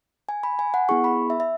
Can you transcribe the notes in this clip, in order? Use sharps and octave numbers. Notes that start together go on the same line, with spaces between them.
G#5
B5
G#5
F#5
B3 E4 G#4 C#6
B5
E5
E5